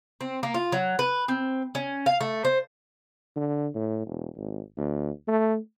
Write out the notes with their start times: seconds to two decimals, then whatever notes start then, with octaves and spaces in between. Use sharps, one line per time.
0.21 C4
0.43 A#3
0.54 F4
0.72 F#3
0.99 B4
1.28 C4
1.75 C#4
2.06 F5
2.21 A3
2.45 C5
3.36 D3
3.75 A2
4.06 E1
4.37 G#1
4.77 D2
5.28 A3